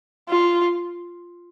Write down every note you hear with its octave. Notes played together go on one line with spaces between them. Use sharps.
F4